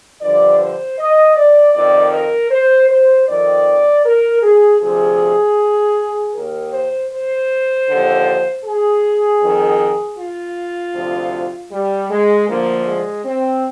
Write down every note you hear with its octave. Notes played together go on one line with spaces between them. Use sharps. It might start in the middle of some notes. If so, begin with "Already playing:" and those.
G2 D3 F3 D5
C5
D#5
D5
F2 D#3 D5
A#4
C5
C5
F2 D#3 D5
A#4
G#4
D2 C3 F3 G#4
D#2 D#3 A#4
C5
C5
D#2 D3 F3
G#4
F2 D#3
F4
D2 C3 F3
G3
G#3
D2 D3 F3 A#3
G#3
C4